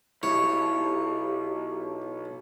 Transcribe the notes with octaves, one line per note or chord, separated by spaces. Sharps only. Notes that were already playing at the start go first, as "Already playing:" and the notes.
B1 E2 E4 G4 C#5